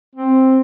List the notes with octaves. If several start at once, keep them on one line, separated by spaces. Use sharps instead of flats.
C4